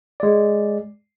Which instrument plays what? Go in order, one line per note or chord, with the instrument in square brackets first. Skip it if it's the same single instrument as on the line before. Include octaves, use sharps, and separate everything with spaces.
[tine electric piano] G#3 D5